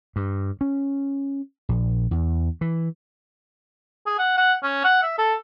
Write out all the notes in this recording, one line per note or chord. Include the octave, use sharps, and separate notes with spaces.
G2
C#4
A#1
E2
E3
G#4
F#5
F#5
C#4
F#5
E5
A4